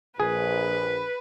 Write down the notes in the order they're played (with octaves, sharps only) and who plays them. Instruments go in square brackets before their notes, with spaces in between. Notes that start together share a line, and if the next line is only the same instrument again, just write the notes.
[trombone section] A#1 [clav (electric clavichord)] G#4 [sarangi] B4